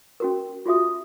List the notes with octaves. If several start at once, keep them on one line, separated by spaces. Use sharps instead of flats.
C#4 F#4 A#4
F4 F#4 G#4 E5 D#6